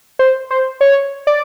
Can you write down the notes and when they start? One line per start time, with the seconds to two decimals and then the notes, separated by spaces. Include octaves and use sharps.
0.19 C5
0.51 C5
0.81 C#5
1.27 D5